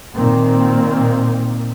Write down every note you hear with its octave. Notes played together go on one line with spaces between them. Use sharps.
A#2 D#3 A#3 C4